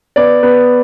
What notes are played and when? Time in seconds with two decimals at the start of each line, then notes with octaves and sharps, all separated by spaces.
0.16 B3 D5
0.43 B3